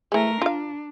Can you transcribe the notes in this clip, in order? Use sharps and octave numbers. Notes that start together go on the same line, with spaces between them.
E3 G#3 A3 A#4
D4 F4 F5